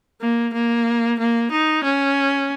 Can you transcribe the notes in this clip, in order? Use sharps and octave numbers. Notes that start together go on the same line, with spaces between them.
A#3
A#3
A#3
D#4
C#4